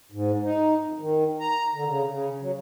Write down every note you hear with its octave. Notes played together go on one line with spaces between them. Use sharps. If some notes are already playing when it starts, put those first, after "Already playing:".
G#2
D#4
F2
D#3
A#5
D3
C#3
C#3
F#3